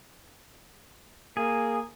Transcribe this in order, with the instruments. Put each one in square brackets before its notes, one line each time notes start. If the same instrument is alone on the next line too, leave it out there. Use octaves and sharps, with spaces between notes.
[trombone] A#3 [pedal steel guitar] G#4